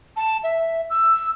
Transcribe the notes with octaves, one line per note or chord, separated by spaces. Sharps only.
A5
E5
E6